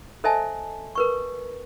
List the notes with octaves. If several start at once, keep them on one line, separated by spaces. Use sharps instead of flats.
A4 C5 D#5 E5 G#5 A5
A#4 B4 C#6